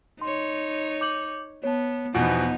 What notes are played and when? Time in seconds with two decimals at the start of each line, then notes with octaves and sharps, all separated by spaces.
0.21 D#4 C#5 C6
1.01 D6 G6 F#7
1.64 B3 C#5 A5
2.14 E2 B2 F3 B3 D#4 F#5